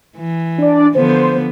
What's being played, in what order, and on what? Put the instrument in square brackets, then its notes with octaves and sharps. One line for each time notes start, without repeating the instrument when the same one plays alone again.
[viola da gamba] E3
[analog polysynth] D4 D5
[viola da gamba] D3 F3 B3 [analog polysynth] C5